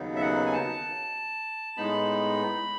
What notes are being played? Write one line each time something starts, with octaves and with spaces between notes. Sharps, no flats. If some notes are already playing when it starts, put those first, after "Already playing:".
Already playing: D#2 C#3 F#3 B3 D#4
E5
F#5
G#5
A5
A2 G#3 B3 D#4 B5